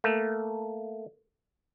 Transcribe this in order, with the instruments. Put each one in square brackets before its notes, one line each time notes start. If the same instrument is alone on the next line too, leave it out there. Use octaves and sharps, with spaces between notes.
[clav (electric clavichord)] A3 A#3